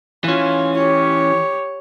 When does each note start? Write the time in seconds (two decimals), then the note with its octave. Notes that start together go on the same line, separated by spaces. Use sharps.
0.24 E3 C#4 F4
0.76 G4 C#5